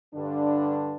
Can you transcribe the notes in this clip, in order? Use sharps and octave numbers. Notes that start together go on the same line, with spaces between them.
G2 D3 D4